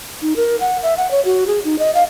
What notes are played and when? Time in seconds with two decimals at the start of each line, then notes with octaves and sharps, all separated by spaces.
0.22 D#4
0.36 A#4
0.60 F#5
0.83 E5
0.97 F#5
1.11 C#5
1.25 F#4
1.47 G#4
1.65 D#4
1.79 D#5
1.95 F5